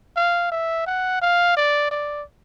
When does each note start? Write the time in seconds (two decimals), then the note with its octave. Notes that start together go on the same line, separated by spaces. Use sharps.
0.16 F5
0.52 E5
0.87 F#5
1.22 F5
1.57 D5
1.91 D5